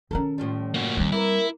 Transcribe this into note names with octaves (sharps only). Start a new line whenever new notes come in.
D#3 C#4 A4 A#4
A2 F3 G3
A#3 F#4
D#2 G3 C4
A#3 E4 A#4 B4